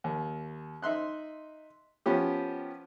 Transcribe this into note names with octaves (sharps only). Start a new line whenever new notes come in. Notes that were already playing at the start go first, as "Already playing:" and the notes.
D#2
D#4 E5 C6 F#6
F3 B3 C#4 G4